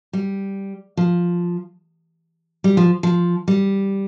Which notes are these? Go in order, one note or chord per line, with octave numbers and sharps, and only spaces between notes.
G3
F3
G3
F3
F3
G3